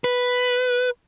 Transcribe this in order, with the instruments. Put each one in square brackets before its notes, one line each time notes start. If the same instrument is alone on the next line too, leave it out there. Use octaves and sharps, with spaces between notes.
[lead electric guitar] B4